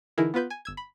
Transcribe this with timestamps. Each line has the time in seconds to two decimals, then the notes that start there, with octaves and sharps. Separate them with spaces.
0.18 D3 E3 D#4 E4 G#4 A#4
0.34 B3 F4 B4 G6
0.50 G#5
0.65 G1 E6 G#6
0.77 B5